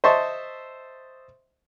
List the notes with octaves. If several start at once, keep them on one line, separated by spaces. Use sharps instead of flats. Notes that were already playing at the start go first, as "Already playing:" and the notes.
C5 D#5 E5 A5 C#6